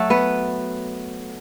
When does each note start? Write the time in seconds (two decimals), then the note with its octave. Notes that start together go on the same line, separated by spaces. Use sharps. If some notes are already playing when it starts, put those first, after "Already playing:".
Already playing: F#3 A3 F#4 A4
0.10 B3 B4